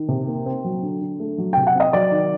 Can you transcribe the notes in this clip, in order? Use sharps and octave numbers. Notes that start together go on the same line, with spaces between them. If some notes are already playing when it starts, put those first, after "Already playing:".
Already playing: D#3
C3
A#3
C4
F#3
D3
D3
A3
F#3
C3 G5
F#5
C4 D#5
F#3 D5
D#3